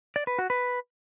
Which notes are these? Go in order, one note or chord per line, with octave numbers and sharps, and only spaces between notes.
D5
B4
F#4
B4